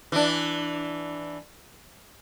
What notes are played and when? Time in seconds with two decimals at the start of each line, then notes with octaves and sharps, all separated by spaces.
0.12 E3 D4